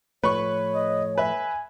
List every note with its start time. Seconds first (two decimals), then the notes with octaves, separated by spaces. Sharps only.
0.24 A2 F3 A3 B4 C#5 C#6
0.75 D#5
1.18 B4 E5 G#5